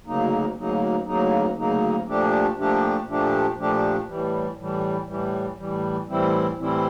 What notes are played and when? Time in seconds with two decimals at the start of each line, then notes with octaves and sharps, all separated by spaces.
0.06 D2 C#3 F#3 A#3 D#4
0.56 D2 C#3 F#3 A#3 D#4
1.06 D2 C#3 F#3 A#3 D#4
1.56 D2 C#3 F#3 A#3 D#4
2.06 A#2 F3 A3 D4 G4
2.56 A#2 F3 A3 D4 G4
3.06 A#2 F3 A3 D4 G4
3.57 A#2 F3 A3 D4 G4
4.06 A2 E3 G3
4.57 A2 E3 G3
5.07 A2 E3 G3
5.57 A2 E3 G3
6.07 A2 E3 G3 C4 E4
6.57 A2 E3 G3 C4 E4